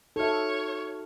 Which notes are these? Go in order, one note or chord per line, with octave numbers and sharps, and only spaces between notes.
D#4 F#4 A4 C#5 E5 F6